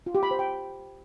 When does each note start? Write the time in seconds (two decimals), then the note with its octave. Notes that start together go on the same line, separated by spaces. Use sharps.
0.06 F4
0.15 G4
0.23 B5
0.31 C5
0.39 G5